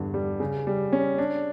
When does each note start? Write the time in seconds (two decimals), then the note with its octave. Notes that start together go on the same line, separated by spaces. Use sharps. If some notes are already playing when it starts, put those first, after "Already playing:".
Already playing: E2 G2 D3
0.14 G3
0.40 C#3
0.67 G3
0.93 C#4
1.18 D4